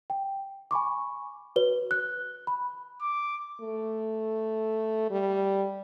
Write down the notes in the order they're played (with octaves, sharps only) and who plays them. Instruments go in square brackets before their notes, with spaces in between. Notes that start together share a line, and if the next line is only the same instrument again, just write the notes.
[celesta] G5
G#5 B5 C#6 D6
F#4 B4 C#5 G7
F#6
B5
[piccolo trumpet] D6
[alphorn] A3
G3